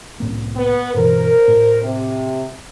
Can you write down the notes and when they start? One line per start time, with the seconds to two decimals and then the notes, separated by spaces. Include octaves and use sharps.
0.20 C2 A2 A#3
0.56 B3 B4
0.94 G2 B2 E3 A#4 C5
1.48 A2
1.82 C3